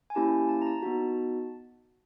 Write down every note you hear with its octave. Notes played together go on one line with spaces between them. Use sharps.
G#5
A#3 C#4 E4 G4 A5
A5
A#5
A5
B3 D#4 F#4